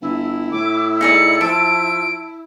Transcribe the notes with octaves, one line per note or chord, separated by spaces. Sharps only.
G1 E4
A2 D6
D#4 G#4 D5 C#7
F3 A5 D7